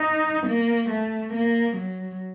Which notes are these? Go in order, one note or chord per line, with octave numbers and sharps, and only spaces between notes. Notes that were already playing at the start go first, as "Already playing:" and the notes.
Already playing: D#4
A#3
A3
A#3
F#3